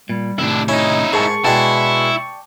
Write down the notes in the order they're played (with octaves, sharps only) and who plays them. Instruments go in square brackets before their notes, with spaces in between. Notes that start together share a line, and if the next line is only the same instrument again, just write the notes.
[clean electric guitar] A#2 [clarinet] G3
[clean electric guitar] A2 C3 D#3 [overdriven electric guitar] D4 E4
[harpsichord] C#4 [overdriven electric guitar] D#4 E4 [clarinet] D#5
[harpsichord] G#2 [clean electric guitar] G#4 A#4 A5 [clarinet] C#6
[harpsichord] B2 G#3 [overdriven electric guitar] E4 [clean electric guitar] D5 G5 A5